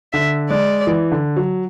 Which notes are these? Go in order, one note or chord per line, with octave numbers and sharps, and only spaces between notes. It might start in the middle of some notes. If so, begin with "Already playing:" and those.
D3 E5
G#3 D5
E3
D3
F#3